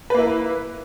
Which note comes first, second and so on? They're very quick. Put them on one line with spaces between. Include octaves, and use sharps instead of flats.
B4 A#3 E4